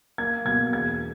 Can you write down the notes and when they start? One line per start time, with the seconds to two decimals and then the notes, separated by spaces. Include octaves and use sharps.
0.18 A#3 G#6
0.45 B2 G#6
0.73 E1 G#6